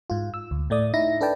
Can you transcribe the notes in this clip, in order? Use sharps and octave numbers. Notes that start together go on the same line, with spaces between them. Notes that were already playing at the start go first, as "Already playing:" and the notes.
G#2 F4
E6
D2
A2 A3 D5 D#6
D#4 E4 E5 A#6
D4 A4 B4 D5 G5 A5